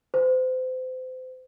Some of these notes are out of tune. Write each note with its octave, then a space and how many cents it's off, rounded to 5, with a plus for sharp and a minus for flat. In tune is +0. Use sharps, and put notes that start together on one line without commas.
C5 -35